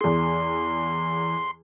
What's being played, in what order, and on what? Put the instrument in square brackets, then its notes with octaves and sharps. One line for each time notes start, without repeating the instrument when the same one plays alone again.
[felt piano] E2 G#4 [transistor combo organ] C6